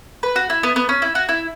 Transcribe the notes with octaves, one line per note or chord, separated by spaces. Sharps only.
B4
F#4
E4
B3
B3
C#4
E4
F#4
E4